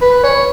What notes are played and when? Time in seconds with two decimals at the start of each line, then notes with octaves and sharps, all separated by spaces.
0.02 B4
0.24 C#5